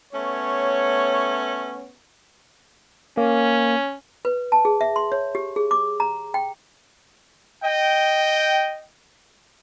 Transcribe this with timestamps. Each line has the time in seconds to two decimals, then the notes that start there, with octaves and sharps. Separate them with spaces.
0.13 A3 B3 C#4 C#5
3.17 A#3 C#4
4.25 B4
4.52 A5
4.65 G#4
4.81 E5
4.96 C6
5.12 C#5
5.35 G4
5.56 G#4
5.71 D6
6.00 A#5
6.34 G5
7.63 D#5 G5